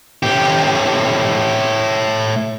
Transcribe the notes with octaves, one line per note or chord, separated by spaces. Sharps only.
A2 G4